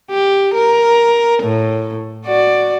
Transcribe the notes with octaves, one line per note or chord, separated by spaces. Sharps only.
G4
A#4
A2
F#4 D5